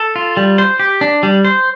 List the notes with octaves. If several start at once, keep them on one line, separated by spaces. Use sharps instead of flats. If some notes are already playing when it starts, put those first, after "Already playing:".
Already playing: A4
F4
G3
C5
G4
D4
G3
C5